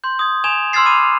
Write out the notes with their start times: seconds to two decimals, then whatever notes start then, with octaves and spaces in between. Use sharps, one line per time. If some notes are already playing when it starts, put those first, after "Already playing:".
0.04 C6 G6
0.19 D#6 G#6
0.44 G#5 C#6 G#6 E7 F7
0.73 C6 E6 F6 G#6 A6 C7
0.86 B5 D6 A6 D#7